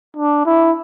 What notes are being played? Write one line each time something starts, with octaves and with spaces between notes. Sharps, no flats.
D4
E4